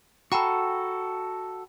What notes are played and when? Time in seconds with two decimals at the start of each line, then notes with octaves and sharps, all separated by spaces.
0.32 F#4 A4 G5 A#5 B5